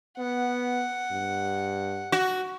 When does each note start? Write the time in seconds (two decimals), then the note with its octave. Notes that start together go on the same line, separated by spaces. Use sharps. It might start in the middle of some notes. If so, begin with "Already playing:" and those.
0.18 B3 F#5
1.11 G2
2.12 F#4